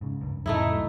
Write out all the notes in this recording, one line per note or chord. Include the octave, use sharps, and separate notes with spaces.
G#2 C#3
C#2 G2
F2 A2 C#3 A3 D#4 E4
C2 F#3